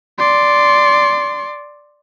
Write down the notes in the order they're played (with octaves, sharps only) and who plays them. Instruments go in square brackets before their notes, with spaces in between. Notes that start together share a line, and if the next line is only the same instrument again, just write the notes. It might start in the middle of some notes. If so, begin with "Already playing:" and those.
[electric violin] D5 C6